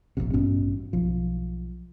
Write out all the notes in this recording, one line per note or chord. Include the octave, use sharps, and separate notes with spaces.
F1 A#1 F2 C3
A1 G2 B2 C#4
B1 F3